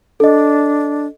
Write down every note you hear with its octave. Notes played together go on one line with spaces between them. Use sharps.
D4 A4 D#5